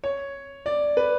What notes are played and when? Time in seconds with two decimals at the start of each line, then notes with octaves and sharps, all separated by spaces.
0.04 C#5
0.66 D5
0.97 B4